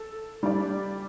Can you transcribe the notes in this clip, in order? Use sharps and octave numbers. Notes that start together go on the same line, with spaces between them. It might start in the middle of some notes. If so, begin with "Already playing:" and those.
Already playing: A4
G3 D4 G4 D5